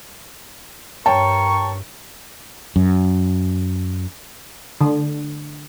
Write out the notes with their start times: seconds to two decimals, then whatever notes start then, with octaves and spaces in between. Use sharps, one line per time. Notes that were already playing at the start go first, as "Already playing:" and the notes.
1.06 G2 A#4 C#5 G5 A5 C#6
2.76 F#2
4.81 D3